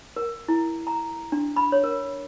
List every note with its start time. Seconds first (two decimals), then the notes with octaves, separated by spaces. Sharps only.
0.16 A#4
0.48 E4
0.87 A#5
1.32 D4
1.56 B5
1.72 C#5
1.84 A#4